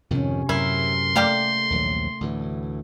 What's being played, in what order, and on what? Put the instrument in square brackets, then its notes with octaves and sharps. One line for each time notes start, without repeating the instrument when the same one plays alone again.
[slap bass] F2 G#2 D#3 [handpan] C3 C#4
[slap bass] F#2 A2 C3 [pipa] E4 [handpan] A#4 [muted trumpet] C6
[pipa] G3 A#3 G4 [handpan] A3
[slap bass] A#1 D#2 F#3
D2 A2 E3